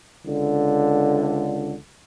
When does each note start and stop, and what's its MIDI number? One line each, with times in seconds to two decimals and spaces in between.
0.25 1.73 37
0.25 1.73 50